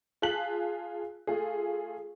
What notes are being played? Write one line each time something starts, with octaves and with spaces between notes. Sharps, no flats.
F4 G#4 A5 F#6 B6 F#7
A3 F4 G#4